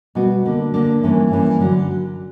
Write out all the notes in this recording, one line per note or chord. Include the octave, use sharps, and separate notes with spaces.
B2 G3 B3 F#4
D3 A#3 D4
D3 A#3 D4
G2 E3 A#3 C#4
G2 E3 A#3 C#4
D3 F#3